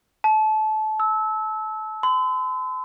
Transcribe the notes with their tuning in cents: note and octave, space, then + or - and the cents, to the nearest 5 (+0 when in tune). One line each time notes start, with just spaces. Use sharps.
A5 -25
E6 -20
C6 -45